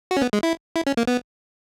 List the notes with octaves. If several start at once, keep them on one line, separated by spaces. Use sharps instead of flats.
F#4
C#4
B3
G#3
E4
E4
C#4
A#3
B3